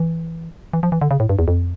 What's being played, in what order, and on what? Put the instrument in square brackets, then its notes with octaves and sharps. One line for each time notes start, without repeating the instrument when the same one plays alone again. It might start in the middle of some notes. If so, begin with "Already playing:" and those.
Already playing: [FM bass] E3
E3
F3
E3
D3
C#3
A2
G2
E2
F2